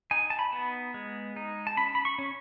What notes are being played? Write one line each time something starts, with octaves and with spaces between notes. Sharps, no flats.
D#4 G#5
A5
B5
B3
G#3
D#4
A5
C#4 B5
B5
C#6
C#4